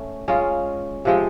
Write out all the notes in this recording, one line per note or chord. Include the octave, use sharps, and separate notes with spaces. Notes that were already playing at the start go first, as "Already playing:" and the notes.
Already playing: A3 C#4
G#3 C#4 F4
C3 F3 G#3